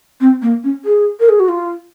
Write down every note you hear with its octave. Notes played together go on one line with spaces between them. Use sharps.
C4
A#3
C#4
G#4
A#4
G#4
F#4
F4